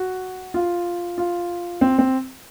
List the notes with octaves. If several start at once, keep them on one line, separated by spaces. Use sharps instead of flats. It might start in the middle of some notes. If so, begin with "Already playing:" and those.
Already playing: F#4
F4
F4
C4
C4